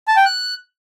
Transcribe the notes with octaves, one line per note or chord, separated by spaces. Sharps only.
A5
G5
F#6